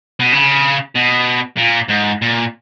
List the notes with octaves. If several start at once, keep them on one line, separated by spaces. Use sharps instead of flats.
B2
C#3
B2
A#2
G#2
A#2